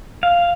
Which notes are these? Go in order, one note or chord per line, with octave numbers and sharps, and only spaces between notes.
F5